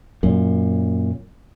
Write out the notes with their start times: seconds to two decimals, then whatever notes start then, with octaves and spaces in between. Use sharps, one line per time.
0.23 F#2 A#2